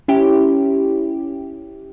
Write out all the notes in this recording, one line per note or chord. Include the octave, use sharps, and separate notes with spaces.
C#4 E4 G4